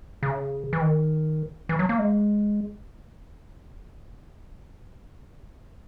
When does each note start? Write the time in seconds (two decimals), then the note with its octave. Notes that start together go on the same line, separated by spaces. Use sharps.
0.23 C#3
0.73 E3
0.81 D#3
1.69 E3
1.79 F#3
1.89 A#3
1.99 G#3